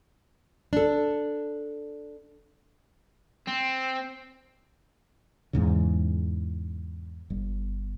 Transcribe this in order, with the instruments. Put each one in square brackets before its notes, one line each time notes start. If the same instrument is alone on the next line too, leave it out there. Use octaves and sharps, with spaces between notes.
[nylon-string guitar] D4 A4
[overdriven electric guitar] C4
[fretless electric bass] E2 G#2 C#3
G1